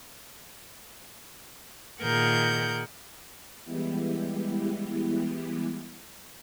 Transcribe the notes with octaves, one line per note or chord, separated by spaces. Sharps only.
A#2 D#3 G#4 A#4 F#5 G6
E3 G3 G#3 B3 E4 G4